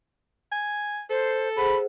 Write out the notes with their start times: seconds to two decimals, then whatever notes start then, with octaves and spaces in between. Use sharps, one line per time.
0.52 G#5
1.10 A4 C5
1.56 G#4 C5 F#5 B5